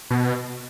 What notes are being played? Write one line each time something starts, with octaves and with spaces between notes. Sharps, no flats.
B2